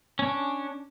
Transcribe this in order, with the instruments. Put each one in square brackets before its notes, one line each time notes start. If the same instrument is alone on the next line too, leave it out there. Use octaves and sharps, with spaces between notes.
[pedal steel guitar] C#4 D4